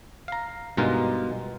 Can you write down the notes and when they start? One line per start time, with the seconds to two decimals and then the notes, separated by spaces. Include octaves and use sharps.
0.28 F5 A#5
0.77 G2 B2 G#3 D#4 F4 A#4